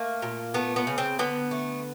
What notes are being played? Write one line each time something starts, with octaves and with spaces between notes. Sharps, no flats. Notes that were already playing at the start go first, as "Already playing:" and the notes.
Already playing: A3 A#3
A#2
A3 B3
B3
C#3
C4
D3 B3
A3